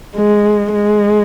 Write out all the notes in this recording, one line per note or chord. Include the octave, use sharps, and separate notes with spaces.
G#3
G#3